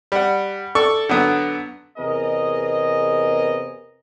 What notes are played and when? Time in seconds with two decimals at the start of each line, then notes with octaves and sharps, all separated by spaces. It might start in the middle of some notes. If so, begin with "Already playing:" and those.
0.12 G3 F#5
0.75 A4 D5 C#6
1.09 D3 F#3 B3
1.98 E2 C3 B3 G#4 A#4 D#5